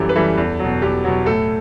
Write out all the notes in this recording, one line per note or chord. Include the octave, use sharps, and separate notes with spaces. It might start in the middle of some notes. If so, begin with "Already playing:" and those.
Already playing: F#2 E3 G3 G4 A4
B4
E3 G3 A4
E2
B2 F#3
E2 G4
B2 F#3
A2 A4